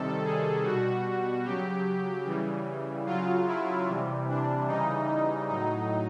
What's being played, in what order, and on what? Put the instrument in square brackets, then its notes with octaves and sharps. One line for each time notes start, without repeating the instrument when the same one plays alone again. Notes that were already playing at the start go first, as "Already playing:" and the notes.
Already playing: [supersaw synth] C3 D#3 G3 A4
G#4
B2 G3 F#4
C#3 F#3 G4
C#3 E3 G3
C#3 F#3 F4
E4
C3 E3 G3
D4
C#3 E3 G3 D#4
D#4
A2 F#3 D#4